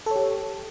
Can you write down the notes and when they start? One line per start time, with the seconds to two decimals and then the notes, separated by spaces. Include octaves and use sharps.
0.06 A4
0.11 C#5
0.16 G4